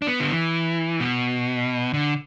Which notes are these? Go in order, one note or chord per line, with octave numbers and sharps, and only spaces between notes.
D4
B3
D3
E3
B2
D3